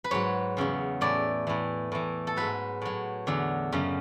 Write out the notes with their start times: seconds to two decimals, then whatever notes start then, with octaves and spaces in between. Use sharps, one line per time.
0.04 B4
0.11 G#2 F#3 C#5
0.57 E2 C#3 F#3
1.01 A2 E3 D5
1.47 A2 E3
1.92 A2 E3
2.27 A4
2.36 G#2 F#3 B4
2.82 A2 F#3
3.27 E2 D3 F#3
3.72 F#2 C#3 F#3